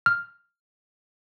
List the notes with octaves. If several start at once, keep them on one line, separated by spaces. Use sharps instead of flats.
F6